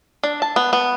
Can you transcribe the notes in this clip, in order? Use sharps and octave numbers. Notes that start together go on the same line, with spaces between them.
D4
A5
B3
B3